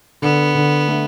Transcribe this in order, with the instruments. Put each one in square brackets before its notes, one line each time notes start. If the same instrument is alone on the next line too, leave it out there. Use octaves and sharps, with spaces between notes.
[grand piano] D3 [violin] B3
[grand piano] D3
A3